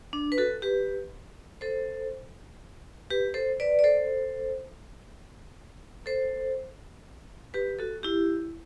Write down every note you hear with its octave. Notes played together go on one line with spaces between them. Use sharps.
D4
B4
F#4 A4
G4 B4
A4 C5
G4 B4
A4 C5
B4 D5
D5
A4 C5
A4 C5
G4 B4
F#4 A4
E4 G4